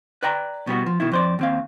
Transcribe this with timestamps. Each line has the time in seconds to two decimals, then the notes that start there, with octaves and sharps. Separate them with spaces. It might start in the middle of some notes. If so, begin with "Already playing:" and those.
0.23 B4 D5 G5 A#5
0.67 B2 G3 B3 F#4
0.86 F3
1.00 B2 D#3 E4
1.12 F2 C5 D5
1.39 D#2 C4 F5